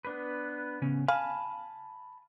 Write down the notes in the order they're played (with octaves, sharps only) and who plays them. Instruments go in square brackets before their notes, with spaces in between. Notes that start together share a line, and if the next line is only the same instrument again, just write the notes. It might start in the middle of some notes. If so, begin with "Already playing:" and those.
[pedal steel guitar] B3 D4 B4
[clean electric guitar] C#3 B3 C#4
[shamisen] F5 [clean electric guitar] G#5 [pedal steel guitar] A5 B5